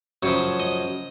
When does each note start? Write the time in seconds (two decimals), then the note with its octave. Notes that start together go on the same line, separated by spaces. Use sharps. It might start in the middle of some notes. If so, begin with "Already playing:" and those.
0.23 F#2 C#3 F3 C#5
0.60 D#5